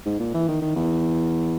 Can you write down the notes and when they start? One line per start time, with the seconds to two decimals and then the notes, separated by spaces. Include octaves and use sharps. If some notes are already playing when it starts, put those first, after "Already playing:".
0.06 G#2
0.20 A#2
0.34 E3
0.48 D#3
0.61 D#3
0.76 E2